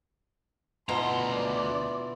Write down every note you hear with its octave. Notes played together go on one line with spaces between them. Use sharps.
D2 B2 E4 F4 A#5 C6
D5